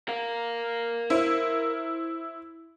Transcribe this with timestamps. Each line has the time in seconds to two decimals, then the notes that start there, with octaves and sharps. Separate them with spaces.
0.08 A#4 F5
1.10 E4 C5